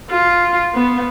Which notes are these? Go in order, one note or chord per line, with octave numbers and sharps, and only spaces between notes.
F4
B3